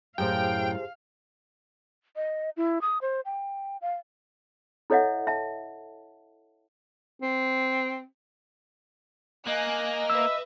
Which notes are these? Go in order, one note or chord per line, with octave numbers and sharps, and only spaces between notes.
F#2 A2 G4 G#4 C5 F5 G5
D#5
E4
D#6
C5
G5
F5
E4 A4 C#5 D#5 E5 F#5
E5 A5
C4
A#3 D#5 G#5 F#6
B4 E5 E6